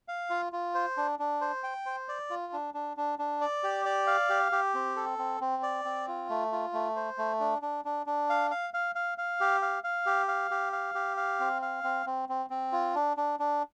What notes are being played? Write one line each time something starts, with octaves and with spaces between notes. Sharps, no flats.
F5
F4
F4
C5
D4
D4
C5
G5
C5
D5
F4
D4
D4
D4
D4
D5
G4
D5
F5
G4
G4
C4
A4
C4
C4
D5
C4
F4
A3
F4
A3
C5
A3
D4
D4
D4
D4
F5
F5
F5
F5
F5
G4
F5
F5
G4
F5
G4
F5
G4
F5
C4
F5
C4
C4
C4
C4
F4
D4
D4
D4